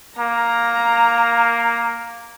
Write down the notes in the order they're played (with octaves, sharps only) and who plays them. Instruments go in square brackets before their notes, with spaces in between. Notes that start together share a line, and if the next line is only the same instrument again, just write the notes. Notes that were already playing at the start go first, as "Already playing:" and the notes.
[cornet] A#3 [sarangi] A#5